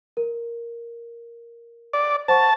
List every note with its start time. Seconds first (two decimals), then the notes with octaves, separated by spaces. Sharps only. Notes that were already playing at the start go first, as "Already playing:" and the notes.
0.17 A#4
1.93 D5
2.28 C5 F#5 A5 C#6